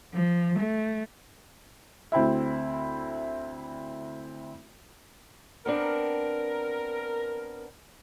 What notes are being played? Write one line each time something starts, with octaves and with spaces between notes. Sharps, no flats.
F3
A3
D2 C4 E4 E5
B3 C4 D4 A#4